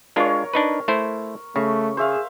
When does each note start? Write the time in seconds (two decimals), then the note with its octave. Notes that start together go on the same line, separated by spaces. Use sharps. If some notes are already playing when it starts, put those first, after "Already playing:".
0.16 G#3 D4 F4 A#4 C#5
0.54 D4 D#4 B4
0.88 A3 E4 C5
1.56 C#3 A3 C#6
1.97 G#4 C5 E5 F5